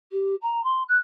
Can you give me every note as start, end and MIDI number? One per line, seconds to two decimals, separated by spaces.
0.12 0.35 67
0.42 0.60 82
0.64 0.83 84
0.88 0.97 90